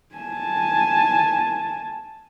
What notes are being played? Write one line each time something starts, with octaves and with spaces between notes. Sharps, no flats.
G#5 A5